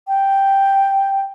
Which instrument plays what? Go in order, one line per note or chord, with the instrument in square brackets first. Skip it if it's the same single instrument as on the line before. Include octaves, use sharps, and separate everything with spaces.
[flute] G5